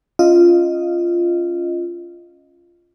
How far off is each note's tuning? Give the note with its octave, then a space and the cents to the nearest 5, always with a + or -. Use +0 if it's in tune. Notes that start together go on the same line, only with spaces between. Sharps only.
C#4 +0 F4 -10 D#5 +0